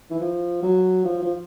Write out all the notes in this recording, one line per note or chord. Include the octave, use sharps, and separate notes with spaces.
E3
F3
F#3
F3
F3